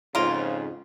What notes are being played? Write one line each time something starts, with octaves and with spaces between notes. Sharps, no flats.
F2 G#2 C#3 A#3 F4